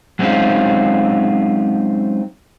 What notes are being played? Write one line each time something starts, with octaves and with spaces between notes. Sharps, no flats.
F#3 G#3 C4 C#4 D#4 F4